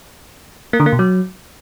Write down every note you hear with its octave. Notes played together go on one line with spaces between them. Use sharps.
A#3
D3
A#3
B2
F#3